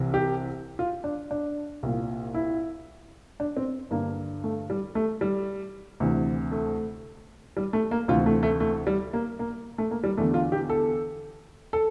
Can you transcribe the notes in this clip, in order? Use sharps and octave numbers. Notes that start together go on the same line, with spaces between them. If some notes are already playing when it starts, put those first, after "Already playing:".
Already playing: C2 C3 E3
G4
F4
D4
D4
C2 A#2
E4
D4
C4
G2 D3 A#3
A3
G3
A3
G3
D2 C3 E3
A3
G3
A3
A#3
D2 C3 E3 F4
A3
A3
A3
G3
A#3
A#3
A3
A#3
G3
E2 D3 A3
F4
G4
A4
A4